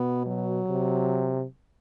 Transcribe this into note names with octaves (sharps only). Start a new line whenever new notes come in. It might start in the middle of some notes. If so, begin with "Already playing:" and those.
Already playing: B2 B3
F#3
C3